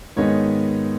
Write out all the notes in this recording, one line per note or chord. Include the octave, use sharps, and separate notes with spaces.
G#2 D#3 G#3 B3 D#4 C#5